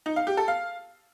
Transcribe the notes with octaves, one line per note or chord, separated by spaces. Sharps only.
D#4
F5
G4
A4
F5